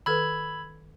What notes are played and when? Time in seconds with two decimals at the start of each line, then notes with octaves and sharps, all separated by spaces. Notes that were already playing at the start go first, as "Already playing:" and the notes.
0.06 D#3 A4 B4 B5 E6 G#6